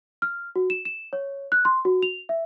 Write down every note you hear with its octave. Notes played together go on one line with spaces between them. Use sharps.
F6
F#4
E7
E7
C#5
F#6
C6
F#4
F7
E5